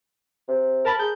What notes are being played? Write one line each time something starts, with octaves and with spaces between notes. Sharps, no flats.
C3
A#4 A5 B5
G#4 G6